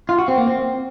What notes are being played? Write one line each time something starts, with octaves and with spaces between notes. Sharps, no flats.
F4
F#4
C4
A#3
C4